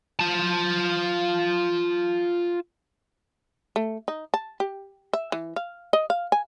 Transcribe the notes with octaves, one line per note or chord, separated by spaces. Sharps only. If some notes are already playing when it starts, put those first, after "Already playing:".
F4 A5
A3
D#4
A5
G4
E5
E3
F5
D#5
F5
G#5